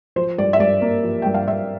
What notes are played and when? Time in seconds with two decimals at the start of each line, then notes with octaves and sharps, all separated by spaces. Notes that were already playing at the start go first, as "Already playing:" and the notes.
0.16 F3 C5
0.38 G2 D5
0.53 E5
0.60 G2 D5
0.82 A#3
1.04 F3
1.22 G2 G5
1.34 F5
1.48 G2 E5